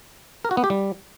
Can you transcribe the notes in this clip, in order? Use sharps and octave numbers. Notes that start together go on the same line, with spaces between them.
A#4
F#4
B3
G4
G3